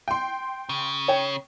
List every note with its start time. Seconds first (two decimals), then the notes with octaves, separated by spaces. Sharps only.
0.08 G5 C6
0.69 C#3
1.08 C#5 G5